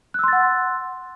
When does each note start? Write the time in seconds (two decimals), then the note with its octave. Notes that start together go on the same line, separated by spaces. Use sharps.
0.14 F#6
0.19 E6
0.24 C6
0.28 A6
0.33 F#5